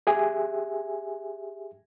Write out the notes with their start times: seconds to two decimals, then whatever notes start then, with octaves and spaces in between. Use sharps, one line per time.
0.07 G4 G#4 E5 G#5